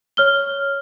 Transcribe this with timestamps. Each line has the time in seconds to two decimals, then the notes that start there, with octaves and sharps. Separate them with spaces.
0.17 C#5 F6 G7